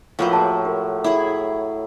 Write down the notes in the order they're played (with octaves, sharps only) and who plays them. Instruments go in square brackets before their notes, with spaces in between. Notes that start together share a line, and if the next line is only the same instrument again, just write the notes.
[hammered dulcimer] A2 F#3 A#3 [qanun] F3 B4 C5
[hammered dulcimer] A2 [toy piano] G#4 A5
[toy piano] G4 A#4
[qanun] E4 G#4 [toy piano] D6